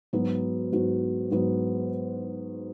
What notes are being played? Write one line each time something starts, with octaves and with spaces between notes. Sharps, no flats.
G#2 F#3 B3 F#4
G#2 F#3 B3 F#4
G#2 F#3 B3 F#4